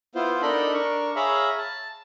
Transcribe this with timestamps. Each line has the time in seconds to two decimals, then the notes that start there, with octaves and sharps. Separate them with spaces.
0.15 B3 E4 F4 C5
0.42 D4 D#4 A4 A#4 D#5 B5
0.74 D4 A#4 C#6
1.16 G#4 C#5 E5 F5 A#5 B5
1.58 A5